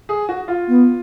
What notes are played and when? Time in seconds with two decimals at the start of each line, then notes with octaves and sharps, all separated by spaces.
0.09 G#4
0.29 F#4
0.48 F4
0.68 B3